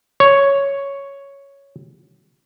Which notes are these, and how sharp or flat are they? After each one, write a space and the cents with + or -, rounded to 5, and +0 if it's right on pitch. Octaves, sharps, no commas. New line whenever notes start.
C#5 +0